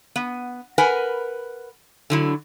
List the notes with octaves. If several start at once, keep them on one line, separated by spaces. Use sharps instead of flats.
B3
A#4 B4 F#5 G#5
D3 F#3 E4